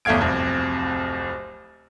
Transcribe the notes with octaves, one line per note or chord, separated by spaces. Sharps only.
G1 E2 A3 F5 G#6 D7
D1 C2 F2